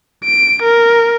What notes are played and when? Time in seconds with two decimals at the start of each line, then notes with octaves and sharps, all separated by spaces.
0.24 D7
0.63 A#4